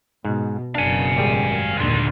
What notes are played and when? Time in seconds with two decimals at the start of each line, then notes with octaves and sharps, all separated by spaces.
0.25 G#2 B2
0.75 F#1 F#2 B2 D4 F5 G#5
1.16 G#1 G3 G#4
1.78 D#2 A#2 D3 G#3 F4